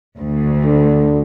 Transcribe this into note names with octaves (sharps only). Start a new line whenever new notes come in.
D2
D3